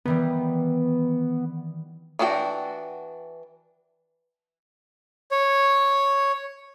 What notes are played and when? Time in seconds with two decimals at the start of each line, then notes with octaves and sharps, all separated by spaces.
0.05 D#3 E3 G3 B3
2.19 E3 D4 F#4 G#4 G5
5.31 C#5